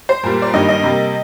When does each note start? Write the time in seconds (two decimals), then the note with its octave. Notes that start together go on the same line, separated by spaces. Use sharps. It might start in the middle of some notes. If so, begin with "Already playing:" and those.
0.09 C5
0.23 A#2 G3 A#3
0.42 D5
0.53 G2 D#3 G3 A#3 D#5
0.69 D#5
0.83 C3 G3 A#3